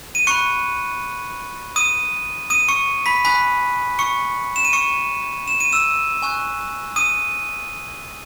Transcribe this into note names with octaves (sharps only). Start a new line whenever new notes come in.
D#7
B5 C#6 F#6 C#7
D#6 D#7
D#6 D#7
C#6 C#7
B5 B6
G#5 B5 D#6 F#6 B6
C#6 C#7
E7
D#7
C#6 C#7
E7
D#7
E6 E7
G#5 C#6 F#6
D#6 D#7